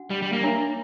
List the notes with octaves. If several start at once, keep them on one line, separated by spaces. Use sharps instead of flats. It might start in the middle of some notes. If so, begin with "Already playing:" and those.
Already playing: D4 F#4 F#5
G3
G3
A#3
D4 A#4 C#5 E5 A#5